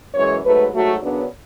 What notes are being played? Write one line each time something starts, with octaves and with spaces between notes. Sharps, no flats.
F#2 E3 G#3 C#5
G#2 F#3 A3 B4
G#2 F#3 A3 F#4
F#2 C#3 F#3 B3 D4